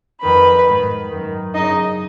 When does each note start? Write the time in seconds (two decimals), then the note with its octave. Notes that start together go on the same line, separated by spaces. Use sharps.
0.22 F2 D#3 B4 B5
0.66 G#2 D#3
1.10 F#2 D#3
1.54 F#2 C#3 D#4 D#5